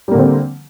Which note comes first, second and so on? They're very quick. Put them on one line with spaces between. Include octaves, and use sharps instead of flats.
G3 A#3 D3 C4